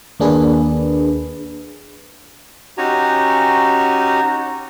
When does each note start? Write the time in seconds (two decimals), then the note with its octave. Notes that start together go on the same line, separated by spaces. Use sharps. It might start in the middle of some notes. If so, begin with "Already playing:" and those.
0.20 D#2 A#3 D4 G#4 B4
2.78 C#4 D#4 F#4 G4 G#5 A#5